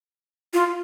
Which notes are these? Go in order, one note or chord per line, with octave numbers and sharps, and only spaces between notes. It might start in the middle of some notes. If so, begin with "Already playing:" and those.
F4